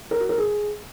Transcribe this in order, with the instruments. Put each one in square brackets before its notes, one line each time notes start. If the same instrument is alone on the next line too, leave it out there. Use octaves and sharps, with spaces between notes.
[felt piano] A#4
F#4
A#4
G#4